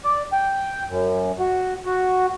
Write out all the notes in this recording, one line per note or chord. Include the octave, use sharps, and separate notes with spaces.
D5
G5
F#2
F#4
F#4